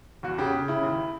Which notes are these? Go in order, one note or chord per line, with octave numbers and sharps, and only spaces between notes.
E2 F#4
C#3 G4
C#3
C#3 E4
D#2